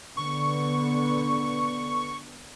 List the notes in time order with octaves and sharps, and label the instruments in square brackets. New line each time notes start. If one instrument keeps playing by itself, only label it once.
[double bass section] D3 B3 [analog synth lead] C#6